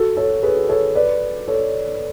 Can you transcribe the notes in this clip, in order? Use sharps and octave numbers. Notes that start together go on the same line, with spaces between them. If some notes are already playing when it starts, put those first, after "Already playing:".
Already playing: F#4 A4
A4 C#5
G#4 B4
A4 C#5
B4 D5
A4 C#5